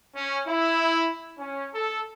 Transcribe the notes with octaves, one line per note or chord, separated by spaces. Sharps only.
C#4
E4
C#4
A4